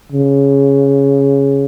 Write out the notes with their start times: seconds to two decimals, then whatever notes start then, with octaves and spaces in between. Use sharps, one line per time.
0.12 C#3